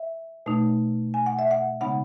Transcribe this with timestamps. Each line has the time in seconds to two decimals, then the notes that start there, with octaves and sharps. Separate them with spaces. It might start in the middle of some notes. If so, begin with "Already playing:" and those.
Already playing: E5
0.46 B2 A3 D#4
1.14 G#5
1.26 F#5
1.39 E5
1.51 F#5
1.81 C#3 G#3 B3 D#4 F#5